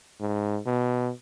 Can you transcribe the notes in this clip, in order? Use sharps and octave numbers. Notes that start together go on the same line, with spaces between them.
G#2
B2